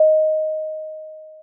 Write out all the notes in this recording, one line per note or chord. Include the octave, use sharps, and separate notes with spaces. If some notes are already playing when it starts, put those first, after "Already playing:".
Already playing: D#5